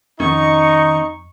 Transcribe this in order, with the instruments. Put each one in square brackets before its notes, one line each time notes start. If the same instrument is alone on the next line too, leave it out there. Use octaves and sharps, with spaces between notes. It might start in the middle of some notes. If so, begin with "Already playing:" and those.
[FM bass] F2 [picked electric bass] D#3 B3 C#4 [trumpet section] D#4 [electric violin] C#6